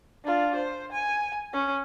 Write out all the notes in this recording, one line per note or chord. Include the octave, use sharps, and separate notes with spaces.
D4 F4
C5
G#5
C#4